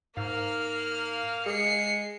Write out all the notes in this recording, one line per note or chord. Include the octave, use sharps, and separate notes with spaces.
G#2 A#3 F5 F6
G#3 G#4 C7 C#7